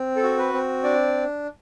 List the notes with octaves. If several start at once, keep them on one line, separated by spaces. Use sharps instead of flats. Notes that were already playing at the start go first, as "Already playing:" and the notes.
Already playing: C4
A4
F#4
B4
C4
D4 D5